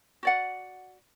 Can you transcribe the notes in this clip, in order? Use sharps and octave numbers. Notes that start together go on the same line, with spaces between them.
F#4 D5 F#5